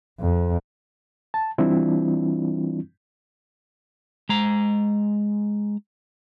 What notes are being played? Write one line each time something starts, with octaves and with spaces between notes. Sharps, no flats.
F2
A5
E3 G3 C4 D4 E4 F4
G#3 A#5